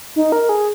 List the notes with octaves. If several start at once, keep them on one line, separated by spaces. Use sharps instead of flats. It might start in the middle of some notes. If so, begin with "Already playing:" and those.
D#4
A#4
G#4